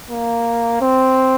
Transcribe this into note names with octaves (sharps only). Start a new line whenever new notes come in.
A#3
C4